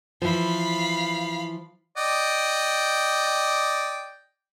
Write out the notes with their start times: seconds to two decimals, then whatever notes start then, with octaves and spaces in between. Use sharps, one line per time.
0.22 E3 F3 F5 B5
1.97 D5 D#5 G5